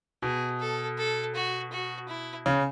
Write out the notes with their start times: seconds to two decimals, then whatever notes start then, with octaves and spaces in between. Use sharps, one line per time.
0.22 B2 G#4
0.59 A4
0.98 A4
1.35 F#4
1.72 F#4
2.08 E4
2.46 C#3